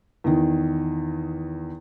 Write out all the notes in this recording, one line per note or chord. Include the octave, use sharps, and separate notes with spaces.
E2 D#3